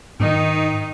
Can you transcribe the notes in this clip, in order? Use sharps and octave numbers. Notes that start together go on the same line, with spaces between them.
G#2 D#3 D#4